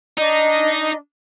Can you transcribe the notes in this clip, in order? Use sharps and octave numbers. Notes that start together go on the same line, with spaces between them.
D4 D#4 D#5